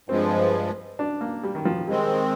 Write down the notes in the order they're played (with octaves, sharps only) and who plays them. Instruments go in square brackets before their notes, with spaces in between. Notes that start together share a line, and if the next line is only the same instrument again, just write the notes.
[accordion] G2 F3 G#3 [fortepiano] C4
[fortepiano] D4
A#3
G3
D#3
F3
[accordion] D#3 G#3 C4 [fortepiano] G3